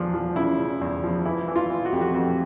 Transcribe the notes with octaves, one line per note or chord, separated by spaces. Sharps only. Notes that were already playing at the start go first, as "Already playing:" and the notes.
Already playing: E2 F3 D4
F3
C#3 E4
C#3
E2
F3
E3 E4
E3
F4
E3
F#4
F2 G4
F#4
F2 F#4